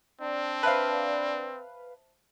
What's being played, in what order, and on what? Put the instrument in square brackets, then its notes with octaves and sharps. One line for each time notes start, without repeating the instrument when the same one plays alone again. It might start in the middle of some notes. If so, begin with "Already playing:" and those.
[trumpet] C4 [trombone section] D4
[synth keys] B4 F5 [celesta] C5 E5 A5